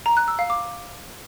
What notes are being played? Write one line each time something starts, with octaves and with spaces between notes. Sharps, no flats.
A#5
F#6
E6
F5
D6